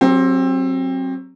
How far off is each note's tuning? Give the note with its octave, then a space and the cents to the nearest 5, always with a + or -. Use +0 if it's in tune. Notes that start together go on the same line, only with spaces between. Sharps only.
F#3 +0 C4 +20 G4 +30